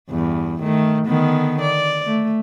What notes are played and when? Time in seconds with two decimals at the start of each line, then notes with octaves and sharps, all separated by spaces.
0.11 E2 G2
0.61 D#3 A3
1.06 D3 D#3 B3
1.61 D5
2.06 A3